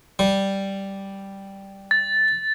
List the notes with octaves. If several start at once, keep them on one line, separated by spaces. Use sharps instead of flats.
G3
A6